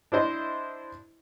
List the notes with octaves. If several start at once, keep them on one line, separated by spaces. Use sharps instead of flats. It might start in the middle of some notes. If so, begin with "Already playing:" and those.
D4 E4 C5 D#5